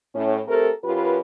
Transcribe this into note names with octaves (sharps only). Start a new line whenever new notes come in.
A2 C#4
A3 C4 G4 A4 A#4
F#2 F4 G4 B4